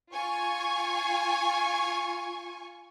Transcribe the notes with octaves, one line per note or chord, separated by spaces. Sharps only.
F4 G#5 C#6